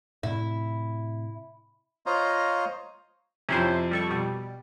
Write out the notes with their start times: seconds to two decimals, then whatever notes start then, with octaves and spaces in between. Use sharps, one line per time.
0.23 A2 C3 E4
2.06 F4 C5 C#5 D#5 F5 A#5
3.49 F2 C3 C#4 E4 C5
3.91 G3 A4 C#6
4.10 B2 G3